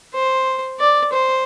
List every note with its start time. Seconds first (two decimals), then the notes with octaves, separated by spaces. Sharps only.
0.14 C5
0.80 D5
1.12 C5